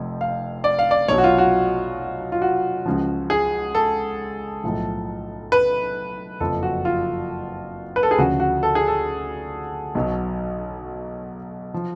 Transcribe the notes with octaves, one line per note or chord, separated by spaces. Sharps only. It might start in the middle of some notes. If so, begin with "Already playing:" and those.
Already playing: F1 F2
F5
D5
F5
D5
B1 B2 F#3 C#5
F#4
F4
F#4
F4
F#4
C#2 C#3 F3
G#4
A4
B1 A2 F3
B4
F#1 F2 F3 A4
F#4
F4
B4
A4
G#4
D2 C#3 F3 F#4
F#4
A4
G#4
A4
B1 B2 F#3
F3